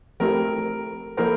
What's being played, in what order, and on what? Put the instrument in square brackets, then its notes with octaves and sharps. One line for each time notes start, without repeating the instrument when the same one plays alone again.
[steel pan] F3 A3 C4 E4 G4 [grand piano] A#4
[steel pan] F3 A#3 E4 A4 C5 [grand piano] A#4